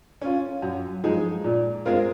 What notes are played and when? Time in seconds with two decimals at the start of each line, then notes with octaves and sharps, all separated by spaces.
0.21 C#4 F4
0.62 F#2
1.04 F3 G#3 D#4 G#4
1.44 A#2
1.85 G#3 C4 F4 A#4